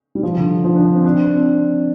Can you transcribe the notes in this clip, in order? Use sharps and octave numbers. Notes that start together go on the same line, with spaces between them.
G3
F3
D3
F3
D4
D4
C4
D4
C4